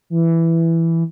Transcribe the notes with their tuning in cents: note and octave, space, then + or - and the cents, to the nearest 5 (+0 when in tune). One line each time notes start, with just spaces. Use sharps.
E3 +5